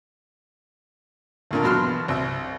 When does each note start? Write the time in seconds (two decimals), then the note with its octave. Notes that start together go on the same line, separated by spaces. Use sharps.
1.51 D2 A#2 D3
1.63 E2 B2 F#3 A5 C6 F6
2.08 C2 E5